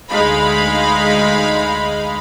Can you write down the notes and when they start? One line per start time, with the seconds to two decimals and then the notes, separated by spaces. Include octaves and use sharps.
0.10 D2 G#3 D#4 F5 B5